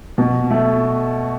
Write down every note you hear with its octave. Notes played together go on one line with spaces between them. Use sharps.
B2
A3